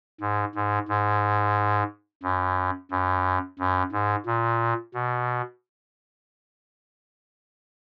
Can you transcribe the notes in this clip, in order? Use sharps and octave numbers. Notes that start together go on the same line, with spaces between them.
G#2
G#2
G#2
F#2
F#2
F#2
G#2
A#2
B2